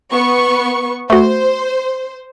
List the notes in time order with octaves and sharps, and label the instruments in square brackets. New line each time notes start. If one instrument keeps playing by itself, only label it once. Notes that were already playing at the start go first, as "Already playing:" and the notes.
[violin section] B3 C#6
[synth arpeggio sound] A3 F#4 [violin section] C5